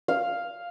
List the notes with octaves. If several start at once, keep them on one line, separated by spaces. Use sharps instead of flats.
F5